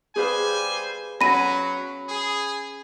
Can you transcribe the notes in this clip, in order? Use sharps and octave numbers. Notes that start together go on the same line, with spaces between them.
G3 G#4 B4 C5 F5 G#5
F#3 C#4 B5 A#6 D#7
G#4